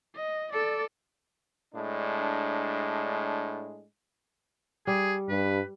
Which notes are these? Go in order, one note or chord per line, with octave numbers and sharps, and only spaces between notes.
D#5
A4 D5
A2 G#3 D4
G3 G#4
G2 B4